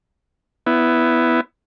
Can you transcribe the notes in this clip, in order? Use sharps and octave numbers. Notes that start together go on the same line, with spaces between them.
B3 E4